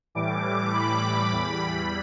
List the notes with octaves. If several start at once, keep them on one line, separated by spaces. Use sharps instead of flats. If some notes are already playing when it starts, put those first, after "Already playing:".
A2 E3 G3 D6
B5
E2 E3 G3